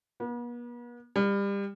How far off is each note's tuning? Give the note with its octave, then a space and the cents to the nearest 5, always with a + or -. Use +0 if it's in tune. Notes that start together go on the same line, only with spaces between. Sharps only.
B3 -45
G3 +30